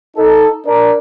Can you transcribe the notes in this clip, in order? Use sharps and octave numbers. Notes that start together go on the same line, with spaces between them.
D#4 A4
D4 A#4 D5